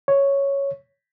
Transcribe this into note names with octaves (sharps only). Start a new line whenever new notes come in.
C#5